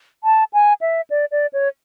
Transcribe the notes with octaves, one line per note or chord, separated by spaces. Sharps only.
A5
G#5
E5
D5
D5
C#5